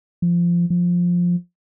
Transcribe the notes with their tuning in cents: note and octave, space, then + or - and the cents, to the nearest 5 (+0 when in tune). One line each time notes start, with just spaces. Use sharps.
F3 -15
F3 +10